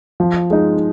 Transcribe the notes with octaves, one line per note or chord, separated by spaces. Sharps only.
F3
G#3 D#4